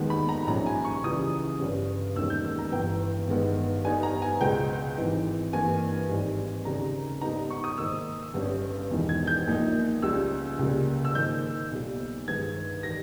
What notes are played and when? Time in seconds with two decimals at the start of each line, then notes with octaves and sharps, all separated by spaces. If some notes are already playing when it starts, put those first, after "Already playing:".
Already playing: D#2 D#3 G#3 B3
0.10 B5
0.29 A#5
0.47 A#1 G#2 G3 C#4 A#5
0.66 G#5
0.85 C#6
1.03 C#2 C#3 E3 G3 D#6
1.60 G1 G2 G3 C#4
2.15 E1 D#2 D#3 A#3 C#4 E6
2.30 G6
2.45 E6
2.59 A#5
2.72 G1 G2 E3 G5
3.28 G1 G2 D#3 G#3 B3
3.84 G2 G3 B3 D#4 G#5
4.03 A#5
4.22 G#5
4.40 C#2 B2 G#3 B3 G5
4.98 G#1 G#2 E3
5.53 G2 E3 A#3 G#5
6.09 G#1 G#2 G3
6.65 D#2 C#3 G3 A#3 A#5
7.21 G#2 G3 B3 D#4 A#5
7.50 C#6
7.64 D#6
7.77 G#2 D#3 A#3 E6
8.34 G1 G2 G3 C#4
8.90 E1 E2 D#3
9.09 G#6
9.27 G6
9.47 A#1 A#2 A#3 D#4
10.02 C#2 C#3 G3 E6
10.59 C#2 C#3 G3 A#3
11.05 E6
11.15 G#2 D#3 A#3 G6
11.71 B1 A#2 G3
12.28 G2 D#3 G#3 D#4 G#6
12.83 D#3 G3 A#6